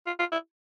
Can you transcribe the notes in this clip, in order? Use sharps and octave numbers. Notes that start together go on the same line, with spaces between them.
F4
F4
E4